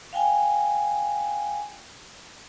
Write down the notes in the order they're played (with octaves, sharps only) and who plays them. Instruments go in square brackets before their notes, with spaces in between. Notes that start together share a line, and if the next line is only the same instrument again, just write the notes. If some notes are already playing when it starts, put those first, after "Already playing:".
[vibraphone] F5 G5 G#5